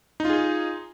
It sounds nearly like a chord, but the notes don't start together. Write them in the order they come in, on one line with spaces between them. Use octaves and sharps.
D#4 F4 G#4